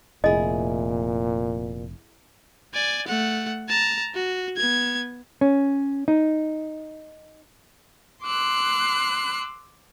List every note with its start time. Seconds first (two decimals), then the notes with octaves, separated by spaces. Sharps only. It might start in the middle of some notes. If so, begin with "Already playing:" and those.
0.24 F1 A#2 E4 G#4 D#5
2.74 D5 G#5
3.07 A3 F#5
3.69 A5 A#5
4.14 F#4
4.57 B3 G#6
5.41 C#4
6.08 D#4
8.23 C6 D6 E6 F#6